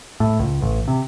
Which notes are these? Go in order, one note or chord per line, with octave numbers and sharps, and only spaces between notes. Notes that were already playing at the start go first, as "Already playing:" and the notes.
A2
C#2
A1
C3